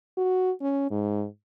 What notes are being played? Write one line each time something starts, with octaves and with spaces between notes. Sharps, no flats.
F#4
C#4
G#2